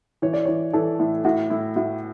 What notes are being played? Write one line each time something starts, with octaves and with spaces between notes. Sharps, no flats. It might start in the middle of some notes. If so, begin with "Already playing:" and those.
E3 C#5
D5
E3 C#5
E3 A4
A2
A2 F#4
A2 E4
A2 F#4